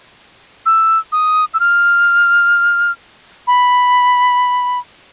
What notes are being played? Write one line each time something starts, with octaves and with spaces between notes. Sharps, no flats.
E6
D#6
E6
F6
B5